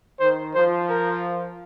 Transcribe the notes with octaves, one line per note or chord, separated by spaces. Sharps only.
D#3 C5
F3 C5
A#4